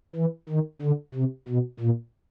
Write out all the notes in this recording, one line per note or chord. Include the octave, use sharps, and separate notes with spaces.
E3
D#3
D3
C3
B2
A#2